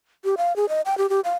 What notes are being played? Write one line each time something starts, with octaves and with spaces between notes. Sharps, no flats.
G4
F5
G#4
D#5
G5
G4
G4
F5